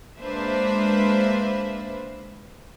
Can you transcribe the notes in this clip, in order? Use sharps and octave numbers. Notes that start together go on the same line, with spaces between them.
G#3 A#3 D4 B4 C5 E5